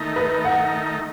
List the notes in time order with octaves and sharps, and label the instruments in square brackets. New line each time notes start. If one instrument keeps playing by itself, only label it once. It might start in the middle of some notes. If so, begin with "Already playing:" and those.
Already playing: [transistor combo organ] D#3 A3 D#4
[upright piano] B4
F#5